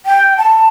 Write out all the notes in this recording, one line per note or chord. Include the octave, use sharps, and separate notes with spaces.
G5
A5